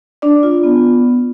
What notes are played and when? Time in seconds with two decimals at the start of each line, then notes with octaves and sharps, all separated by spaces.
0.22 D4 D5
0.43 F4
0.64 B3